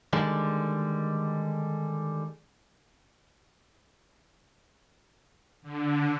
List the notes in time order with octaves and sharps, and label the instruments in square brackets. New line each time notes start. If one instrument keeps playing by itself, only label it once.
[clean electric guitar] D3 D#3 G3 G#3
[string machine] D3